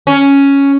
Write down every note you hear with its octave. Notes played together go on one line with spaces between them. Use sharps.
C#4